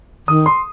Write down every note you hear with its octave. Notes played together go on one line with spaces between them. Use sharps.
D#3 D#6
C6